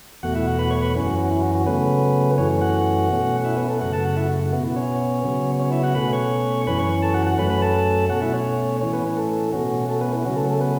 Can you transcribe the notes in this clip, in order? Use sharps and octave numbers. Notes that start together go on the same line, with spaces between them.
E2 B2 A3 F#4 F#5
E4 E5
F#4 F#5
B4 B5
C#5 C#6
B4 B5
F#2 E3 C#4
F#4
F#4
E4
F#4
F#4
C#3 F#3 A3 B3 C#4 B4
F#2 E3 A3 C#4 C#5
F#4 F#5
B2 A3 C#4
E4 E5
B3 B4
A3 A4
F#2 C#3 A3 F#4 F#5
A4 A5
F#4 F#5
E4 E5
F#4
B2 B3 F#4
E4
C#4 C#5
C#3 F#3 B3
C#4 C#5
E4 E5
F#4 F#5
B2 A3 C#4 B4 B5
C#5 C#6
F#2 E3 C#4 B4 B5
C#5 C#6
A4 A5
F#4 F#5
F#4 F#5
F#2 F#3 A3 C#4 B4 B5
B4 B5
A4 A5
B2 A3 C#4 F#4 F#5
E4 E5
C#4 C#5
A2 E3 C#4 C#5
B3 B4
A3 A4
B2 A3 C#4 F#4
A3 A4
B3 B4
E4
C#3 F#3 C#4 F#4
A3 A4
A3 A4
B3 B4